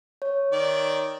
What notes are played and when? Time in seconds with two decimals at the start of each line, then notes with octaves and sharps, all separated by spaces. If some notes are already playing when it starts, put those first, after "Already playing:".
0.22 C#5
0.52 D#3 D5